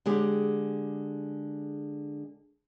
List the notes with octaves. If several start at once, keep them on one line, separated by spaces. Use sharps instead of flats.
D3 G#3 G4 G#4